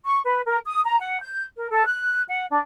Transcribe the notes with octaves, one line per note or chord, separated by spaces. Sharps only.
C#6
B4
A#4
D#6
A#5
F#5
G6
A#4
A4
F#6
F#5
D4